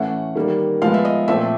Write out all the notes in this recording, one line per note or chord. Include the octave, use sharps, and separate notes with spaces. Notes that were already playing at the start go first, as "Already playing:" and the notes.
Already playing: A2 E3 A3 C#4 F#5
D#3 G3 A#3
F3 G#3 B3 F5
E5
D#5
A#2 F3 A3 C4 E5